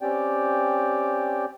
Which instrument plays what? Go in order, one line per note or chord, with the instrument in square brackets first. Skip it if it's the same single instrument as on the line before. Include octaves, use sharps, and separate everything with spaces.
[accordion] C4 C#4 G4 D5 G5